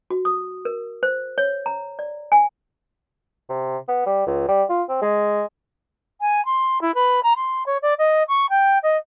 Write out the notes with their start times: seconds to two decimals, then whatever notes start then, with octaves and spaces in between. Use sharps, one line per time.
0.10 F#4
0.25 D#6
0.65 A#4
1.03 C5
1.38 C#5
1.66 A#5
1.99 D5
2.32 G#5
3.49 C3
3.88 B3
4.06 G3
4.26 C#2
4.48 G3
4.69 F4
4.88 C4
5.02 G#3
6.21 G#5
6.45 C6
6.82 E4
6.95 B4
7.23 A#5
7.36 C6
7.66 C#5
7.82 D5
7.98 D#5
8.28 C#6
8.50 G5
8.83 D#5